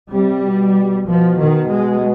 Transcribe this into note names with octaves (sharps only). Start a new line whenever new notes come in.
C3 G3
B2
B2 F3
D#3
G#3